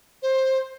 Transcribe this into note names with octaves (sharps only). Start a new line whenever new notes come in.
C5